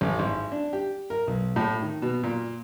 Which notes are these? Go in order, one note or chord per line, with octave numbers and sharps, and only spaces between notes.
A1
G#1
D4
G4
A#4
B1
A2
D#3
B2
A#2